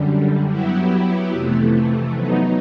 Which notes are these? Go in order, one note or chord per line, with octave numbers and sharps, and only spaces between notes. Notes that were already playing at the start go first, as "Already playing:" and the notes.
Already playing: F#2 D3 G3
F#3 B3 E4 G4
F2 C3 E3 A3
F#3 B3 D#4